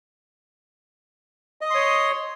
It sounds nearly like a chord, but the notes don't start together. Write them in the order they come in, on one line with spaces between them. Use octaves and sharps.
D#5 D#6 C6 C#5